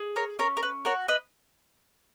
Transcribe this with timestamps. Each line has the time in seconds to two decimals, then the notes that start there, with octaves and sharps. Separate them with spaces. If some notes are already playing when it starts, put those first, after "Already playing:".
Already playing: G#4
0.16 A#4 C#5
0.39 C#4 A#4 C#5
0.57 A#4
0.63 B4
0.85 F#4 A#4 C#5
1.08 B4 D#5